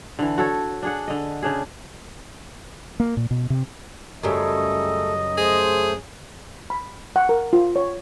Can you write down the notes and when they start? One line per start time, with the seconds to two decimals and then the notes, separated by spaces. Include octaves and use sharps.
0.19 D3 E3
0.38 F#4 A4 C#5
0.82 D4 G#4 F#5
1.08 D3 D#5
1.43 C#3 D4 G#4
3.00 A#3
3.17 A#2
3.31 B2
3.50 C3
4.23 F#2 C#3 G3 A3 A4 D#5
5.37 A3 G#4 C5
6.70 B5
7.16 F#5
7.29 A#4
7.53 F4
7.76 C#5